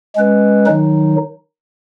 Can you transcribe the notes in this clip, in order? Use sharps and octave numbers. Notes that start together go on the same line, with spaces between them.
G#3 C#4 B4
D#3 F#3 D#4